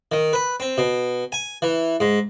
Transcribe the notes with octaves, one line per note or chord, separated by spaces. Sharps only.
D#3
B4
C4
B2
G#5
E3
G#2